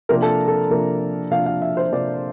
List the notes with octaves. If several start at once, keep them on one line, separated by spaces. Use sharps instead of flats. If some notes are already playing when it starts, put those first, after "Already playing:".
C3 F3 A#3 D4 A#4
A4
A4
C3 F3 A#3 D4
C3 F3 A#3 D4 F5
F5
E5
C5
C3 F3 A#3 D4 D5